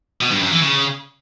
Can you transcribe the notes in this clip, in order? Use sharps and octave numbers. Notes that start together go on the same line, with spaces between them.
B2
G2
F#2
E3
C#3